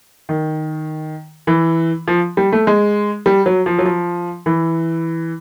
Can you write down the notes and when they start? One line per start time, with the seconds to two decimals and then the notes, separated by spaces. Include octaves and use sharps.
0.29 D#3
1.47 E3
2.08 F3
2.37 G3
2.52 A3
2.67 G#3
3.26 G3
3.46 F#3
3.66 F3
3.78 F#3
3.85 F3
4.46 E3